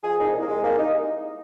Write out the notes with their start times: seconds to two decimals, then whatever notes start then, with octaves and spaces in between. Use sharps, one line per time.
0.03 F3 G#4
0.18 C2 D#4
0.33 C2
0.41 A#3
0.48 C2 G#3
0.63 C2 A#3
0.77 C2 D#4